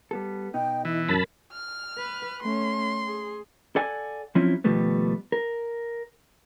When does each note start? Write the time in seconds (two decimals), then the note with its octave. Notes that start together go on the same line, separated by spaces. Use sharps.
0.11 G3 B3 A4
0.54 B2 B3 D#4 G5
0.85 E3 E4
1.09 B1 F#2 C#4 A#4 A5 B5
1.52 F6
1.98 B4
2.42 A3 C#4 C6
3.07 G#4
3.76 A4 D5 F#5 G#5
4.35 F3 F#3 C4 C#4 E4 F4
4.64 D#2 B2 F3 G3 A3 B3
5.32 A#4